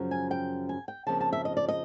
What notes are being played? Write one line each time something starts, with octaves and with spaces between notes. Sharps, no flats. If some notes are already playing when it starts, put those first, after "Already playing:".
Already playing: F#2 C#3 F3
G#5
G5
G#5
G5
F2 C#3 F3 A#3 D#4 A5
A5
E5
D#5
D5
D#5